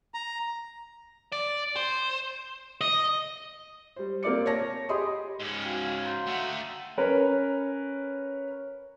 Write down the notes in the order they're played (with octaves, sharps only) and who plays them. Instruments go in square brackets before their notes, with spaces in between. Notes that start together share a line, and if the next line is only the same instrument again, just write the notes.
[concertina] A#5
[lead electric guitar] D5
C5
D#5
[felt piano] G3 C5
A#3 C4 D5 D6 C#7
C#5 A5 A#6
G4 G#4 D#5 B5 C6 D#6
[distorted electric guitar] G#2 C#4
[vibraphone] F#4 F5 G5 [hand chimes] F6 G#6
[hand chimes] A#5 C6 G6
[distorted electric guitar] A3 D4 [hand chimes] F#5 A#5
[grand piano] C#4 A#4 B4 C#5